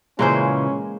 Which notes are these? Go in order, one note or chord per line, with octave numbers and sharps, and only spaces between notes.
A#2 C#3 E3 G#3 A#3 C#4 C5